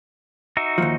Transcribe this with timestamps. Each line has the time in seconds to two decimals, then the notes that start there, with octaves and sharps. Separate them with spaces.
0.57 D#4 F#4 E5
0.78 D#2 G#2 F3